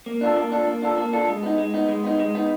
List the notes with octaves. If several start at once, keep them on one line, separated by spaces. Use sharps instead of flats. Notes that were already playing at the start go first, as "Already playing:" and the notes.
A#3
D4 F4 A4
A#3
D4 F4 A4
A#3
D4 F4 A4
A#3
D4 F4 A4
G#3
B3 D#4
G#3
B3 D#4
G#3
B3 D#4
G#3
B3 D#4